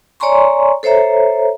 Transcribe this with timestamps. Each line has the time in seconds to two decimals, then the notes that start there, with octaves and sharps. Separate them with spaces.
0.20 C#5 D5 G#5 A#5 C6 C#6
0.83 A4 C5 C#5 E5 A#5